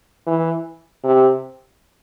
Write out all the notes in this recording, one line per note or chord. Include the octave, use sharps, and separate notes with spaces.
E3
C3